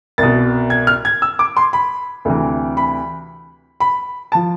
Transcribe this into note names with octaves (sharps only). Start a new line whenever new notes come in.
C2 B2 A6
G#6
F6
G#6
E6
D6
C6
B5
D2 C3 E3
B5
B5
A5
F3